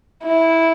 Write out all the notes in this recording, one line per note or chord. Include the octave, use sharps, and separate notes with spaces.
E4